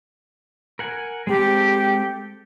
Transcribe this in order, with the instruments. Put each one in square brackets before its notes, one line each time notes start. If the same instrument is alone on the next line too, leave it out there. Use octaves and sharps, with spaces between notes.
[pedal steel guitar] A#4 F#5 G#5
[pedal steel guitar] G#3 C4 A4 [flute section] G4